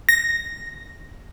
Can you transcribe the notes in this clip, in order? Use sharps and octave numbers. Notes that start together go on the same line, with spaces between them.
A#6